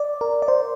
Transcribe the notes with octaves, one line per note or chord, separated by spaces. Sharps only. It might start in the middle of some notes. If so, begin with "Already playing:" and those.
Already playing: D5
A#4
D5
C5